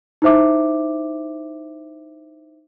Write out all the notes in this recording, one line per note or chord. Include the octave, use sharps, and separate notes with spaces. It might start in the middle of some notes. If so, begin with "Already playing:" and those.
D#4 E4 C5 E5 D6